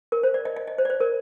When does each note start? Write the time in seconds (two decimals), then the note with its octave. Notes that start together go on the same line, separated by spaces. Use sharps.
0.12 A#4
0.23 C5
0.34 D5
0.45 D#5
0.56 D#5
0.67 D#5
0.78 C5
0.85 D5
0.90 C5
1.00 A#4